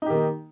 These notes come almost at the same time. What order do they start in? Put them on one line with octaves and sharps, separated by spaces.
D#4 G4 D#3 A#3